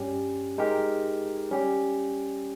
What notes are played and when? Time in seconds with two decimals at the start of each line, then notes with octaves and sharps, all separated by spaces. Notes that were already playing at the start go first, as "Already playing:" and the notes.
Already playing: G2 G3 C#4 G4
0.58 G#3 D#4 G4 A#4
1.51 G3 C#4 G4